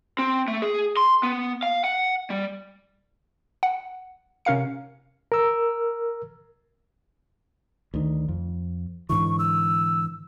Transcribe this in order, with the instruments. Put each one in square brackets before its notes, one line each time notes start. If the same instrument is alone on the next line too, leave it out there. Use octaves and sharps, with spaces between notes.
[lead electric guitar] C4
A3
G#4
C6
B3
F5
F#5
G3
[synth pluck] F#5
C3 C#4 A#4 F5 C#7
[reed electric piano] A#4 E6
[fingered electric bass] D2 D#3
F2
[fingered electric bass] G#2 D3 E3 [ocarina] C#6
[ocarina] E6